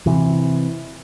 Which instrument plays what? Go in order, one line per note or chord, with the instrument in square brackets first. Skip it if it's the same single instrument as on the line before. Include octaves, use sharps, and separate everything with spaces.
[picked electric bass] C3 E3